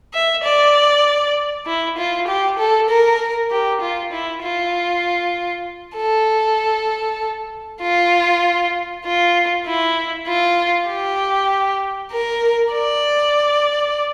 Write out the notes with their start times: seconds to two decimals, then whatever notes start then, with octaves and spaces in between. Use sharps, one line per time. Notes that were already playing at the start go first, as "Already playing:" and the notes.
0.14 E5
0.44 D5
1.66 E4
1.98 F4
2.28 G4
2.59 A4
2.89 A#4
3.51 G4
3.81 F4
4.13 E4
4.43 F4
5.96 A4
7.81 F4
9.05 F4
9.66 E4
10.27 F4
10.88 G4
12.12 A#4
12.73 D5